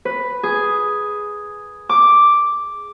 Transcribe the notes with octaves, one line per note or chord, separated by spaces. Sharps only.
B4
G#4
D6